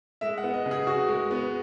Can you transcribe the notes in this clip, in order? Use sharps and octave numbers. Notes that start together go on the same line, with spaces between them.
G#3 E5
F#5
B3
D#5
C#3
G#4
C#3 F#4
G#3
B3